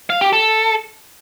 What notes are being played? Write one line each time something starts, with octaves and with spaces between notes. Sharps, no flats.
F5
G4
A4